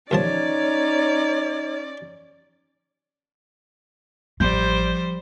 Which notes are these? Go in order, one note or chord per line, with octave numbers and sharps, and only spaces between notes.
D#2 F3 C#4 D#4 C#5 D5 A5
A1 F3 G3 C5 G6